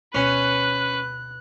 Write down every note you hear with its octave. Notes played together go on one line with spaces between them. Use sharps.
D2 B2 C#4 B4 F#6